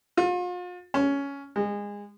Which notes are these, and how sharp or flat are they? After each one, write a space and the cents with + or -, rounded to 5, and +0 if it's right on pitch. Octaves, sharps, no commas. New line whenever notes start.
F4 +40
C#4 +10
G#3 -25